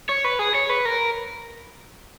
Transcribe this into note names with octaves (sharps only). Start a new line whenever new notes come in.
C#5
B4
G#4
C#5
B4
A#4